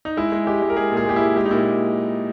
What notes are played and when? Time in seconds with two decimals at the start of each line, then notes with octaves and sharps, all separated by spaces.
0.05 D#4
0.17 G#3 E4
0.32 G#3
0.47 G#3 G4
0.62 G#3
0.70 A#4
0.77 G#3 G#4
0.92 A#2
0.97 G#4
1.06 G#3 G4
1.16 E4
1.21 G#3
1.36 G#3 G4
1.45 D#4
1.51 A#2 E4